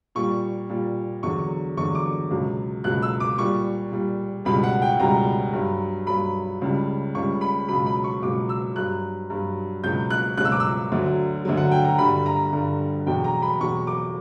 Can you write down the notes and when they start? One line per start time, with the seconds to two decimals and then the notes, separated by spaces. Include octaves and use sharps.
0.15 A#2 G3 C#6
0.69 A#2 G3
1.23 E2 D3 F#3 C#6
1.77 E2 D3 F#3 C#6
1.95 D6
2.31 C#2 B2 F#3
2.84 C#2 B2 F#3 F#6
3.02 E6
3.20 D6
3.38 A#2 G3 C#6
3.92 A#2 G3
4.45 C#2 B2 G3 B5
4.63 F#5
4.82 G5
5.00 C#2 B2 G3 A#5
5.53 G2 F#3
6.07 G2 F#3 B5
6.62 C#2 C#3 G3
7.15 C#2 C#3 G3 C#6
7.41 B5
7.68 C#2 B2 F#3 B5
7.86 B5
8.04 C#6
8.22 C#2 B2 F#3 D6
8.49 E6
8.76 G2 F#3 F#6
9.30 G2 F#3
9.84 C#2 B2 F#3 G6
10.10 F#6
10.37 C#2 B2 F#3 F#6
10.45 E6
10.52 D6
10.60 E6
10.92 D2 D3 F#3
11.45 D2 D3 F#3
11.57 F#5
11.71 G5
11.85 A#5
11.98 G2 D3 G3 B5
12.26 A#5
12.53 G2 D3 G3
13.06 E2 B2 F#3 G5
13.24 A#5
13.42 B5
13.60 E2 B2 F#3 C#6
13.87 D6